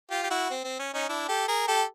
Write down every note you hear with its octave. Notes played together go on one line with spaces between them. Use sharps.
F4 G4
G4
E4 F#4
C4
C4
C#4
C#4 D#4
D4 E4
G4 A4
G#4 A#4
G4 A4